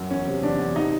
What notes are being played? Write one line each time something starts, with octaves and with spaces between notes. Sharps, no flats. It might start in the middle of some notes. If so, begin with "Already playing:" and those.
Already playing: F#2
E2 C#4
C3
E2 D4
E2
C3 D#4